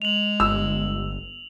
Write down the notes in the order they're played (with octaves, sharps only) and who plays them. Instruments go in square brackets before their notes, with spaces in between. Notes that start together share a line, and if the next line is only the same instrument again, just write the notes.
[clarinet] G#3 [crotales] F7 F#7
[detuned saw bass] G1 [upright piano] E6